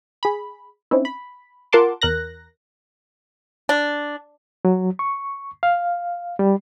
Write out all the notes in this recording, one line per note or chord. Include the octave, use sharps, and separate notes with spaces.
G#4 B5
C4 C#4 D#4 E4
B5
F4 A#4 F#5 A5 C6 D6
E2 A#4 F#6 A#6
D4
F#3
C#6
F5
G3